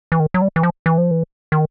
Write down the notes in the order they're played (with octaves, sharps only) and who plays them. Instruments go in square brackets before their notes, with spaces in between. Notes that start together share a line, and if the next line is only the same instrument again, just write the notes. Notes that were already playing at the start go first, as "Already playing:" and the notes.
[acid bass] E3
D#3
F#3
G3
E3
F3
E3
F3
E3
D#3